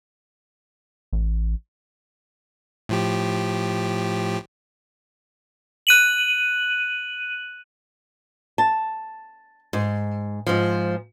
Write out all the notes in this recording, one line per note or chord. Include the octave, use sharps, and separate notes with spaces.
A1
A2 F3 G4
F#6 D#7 F#7
A5
G#2
G#2 F3